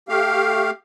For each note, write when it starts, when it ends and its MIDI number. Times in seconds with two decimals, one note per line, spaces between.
0.09 0.70 57
0.09 0.70 67
0.09 0.70 77